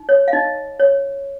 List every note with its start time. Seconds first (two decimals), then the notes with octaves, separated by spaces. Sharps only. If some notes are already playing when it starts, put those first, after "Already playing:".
Already playing: D#4
0.09 C#5
0.28 F5
0.33 D#4 D#5
0.80 C#5